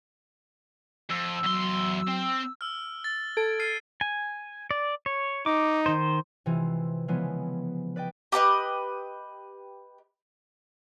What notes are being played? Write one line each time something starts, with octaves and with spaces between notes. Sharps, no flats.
F2 E6
E2 F#3 C6
C4
E6 F6
A6
A4 G#6 D7
F6 C7 D#7
G#5
D5
C#5
D#4 D6
D#3 C5
C3 E3 G#3 F4
C#3 E3 F3 G#3 B3
B4 D5 D#5 G5
G4 A4 B4 D#5